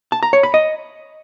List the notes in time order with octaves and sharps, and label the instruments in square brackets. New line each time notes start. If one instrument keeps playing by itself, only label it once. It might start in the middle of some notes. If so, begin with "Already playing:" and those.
[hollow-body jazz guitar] A5
A#5
C#5
B5
D#5